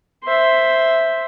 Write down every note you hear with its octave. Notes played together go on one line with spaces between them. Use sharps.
C5 E5